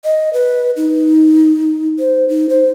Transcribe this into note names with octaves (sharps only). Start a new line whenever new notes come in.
D#5
B4
D#4
C5
D#4
C5